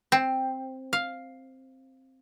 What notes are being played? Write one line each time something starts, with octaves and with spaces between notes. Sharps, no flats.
C4
F5